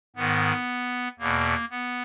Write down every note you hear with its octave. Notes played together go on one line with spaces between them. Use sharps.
G#2 D#3 B3
E2 B2 A#3
B3